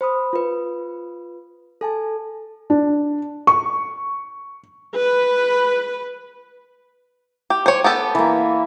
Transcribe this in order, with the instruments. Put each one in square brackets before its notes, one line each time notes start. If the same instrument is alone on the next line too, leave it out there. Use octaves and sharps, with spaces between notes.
[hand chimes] C5 B5 D#6
F4 B4
A4 G#5 A5
[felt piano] D4
C#6
[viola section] B4
[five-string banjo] G4
[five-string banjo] C5 C#5 [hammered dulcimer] G#5 D6
[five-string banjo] B3 G4 A4
[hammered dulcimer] E3 A#3